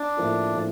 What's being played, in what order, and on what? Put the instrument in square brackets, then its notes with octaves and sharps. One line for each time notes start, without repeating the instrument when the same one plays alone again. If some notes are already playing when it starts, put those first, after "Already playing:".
Already playing: [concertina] D4
[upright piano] A2 F3 A#3 F4
A2 F3